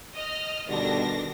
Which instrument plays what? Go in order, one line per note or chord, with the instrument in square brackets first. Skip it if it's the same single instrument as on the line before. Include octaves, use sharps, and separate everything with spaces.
[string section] D#5 F6
[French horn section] B2 D3 G3 [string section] D#3 D4 A#6